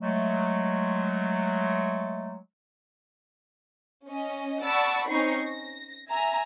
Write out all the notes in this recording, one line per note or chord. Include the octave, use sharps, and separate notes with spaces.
F#3 G#3 A3
C#4 D#5
D5 F#5 A5 B5 C#6 E6
C4 C#4 D#4 C#6 C7
A#6
E5 G#5 A#5